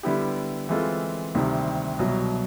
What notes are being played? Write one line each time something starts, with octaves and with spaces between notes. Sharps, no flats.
D3 G3 B3 E4 G4
E3 G#3 C4 F4 A4
D2 C3 D#3 G3 C4
C2 B2 F#3